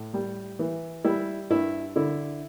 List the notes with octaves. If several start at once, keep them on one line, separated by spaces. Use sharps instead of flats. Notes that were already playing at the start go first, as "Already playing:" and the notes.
Already playing: A2
G3
E3
G3 E4
G2 E4
D3 E4